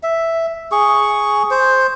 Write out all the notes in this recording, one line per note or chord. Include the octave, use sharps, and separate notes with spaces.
E5
G#4 C#6
C5